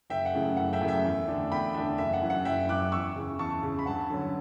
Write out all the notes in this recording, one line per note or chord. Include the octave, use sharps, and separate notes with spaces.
F#1 E5 G5
F#5
F#2 C#3 E3 A3
F#1 F#5
E5 G5
F#2 C#3 E3 A3
E5 G5
E2
D3 A3 D4
E2 G5 B5
D3 A3 D4 E5
F#1 E5
F#5
F#2 E3
F#5
F#1 E5 G5
F#2 E3 D6 F#6
E2 C#6 E6
C#3 E3
E2 A5 C#6
C#3 E3
B5
G2 F#5 A5
D3 F#3 C#4